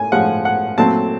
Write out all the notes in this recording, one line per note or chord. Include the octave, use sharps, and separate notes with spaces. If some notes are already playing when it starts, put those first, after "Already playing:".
Already playing: A2 G#5
A2 F3 G#3 F#5
F#5
A#2 F#3 A3 C4 A5